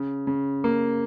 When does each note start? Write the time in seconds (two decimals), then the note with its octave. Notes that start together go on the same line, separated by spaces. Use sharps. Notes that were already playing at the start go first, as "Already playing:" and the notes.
Already playing: C#3
0.27 C#3
0.64 A#3